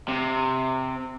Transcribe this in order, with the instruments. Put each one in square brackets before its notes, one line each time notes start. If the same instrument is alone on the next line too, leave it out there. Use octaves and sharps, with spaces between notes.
[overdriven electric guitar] C3